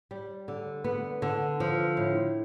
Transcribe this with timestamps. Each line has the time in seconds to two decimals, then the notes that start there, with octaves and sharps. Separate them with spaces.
0.11 G3
0.48 D3
0.84 B3
1.22 D3
1.60 F3
1.97 A2